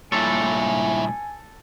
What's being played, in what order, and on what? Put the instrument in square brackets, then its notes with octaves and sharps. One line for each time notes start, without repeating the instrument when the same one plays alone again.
[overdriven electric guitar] G2 A#2 [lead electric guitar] E4 C#5 [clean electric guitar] A4 [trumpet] G#5